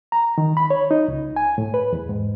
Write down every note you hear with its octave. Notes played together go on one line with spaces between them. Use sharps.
A#5
D#3
B5
C#5
D#4
C#2
G#5
A2
B4
E2
G#2